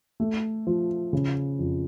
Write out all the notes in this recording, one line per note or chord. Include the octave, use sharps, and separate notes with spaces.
A3
F3
C#3
F2